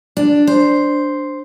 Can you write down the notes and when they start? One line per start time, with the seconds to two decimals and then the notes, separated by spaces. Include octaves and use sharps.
0.17 D4
0.47 C5